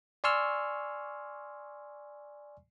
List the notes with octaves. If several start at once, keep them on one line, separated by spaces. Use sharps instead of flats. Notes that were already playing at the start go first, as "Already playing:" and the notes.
D5 G#5 C6 C#6 E6 F6